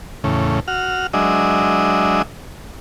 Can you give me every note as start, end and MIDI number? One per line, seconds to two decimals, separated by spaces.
0.24 0.60 40
0.24 0.60 45
0.24 0.60 49
0.68 1.07 66
0.68 1.07 89
1.13 2.22 54
1.13 2.22 56
1.13 2.22 62
1.13 2.22 75
1.13 2.22 76